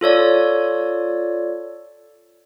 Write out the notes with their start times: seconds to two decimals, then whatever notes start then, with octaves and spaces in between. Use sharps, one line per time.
0.01 F4 A4 C#5 D5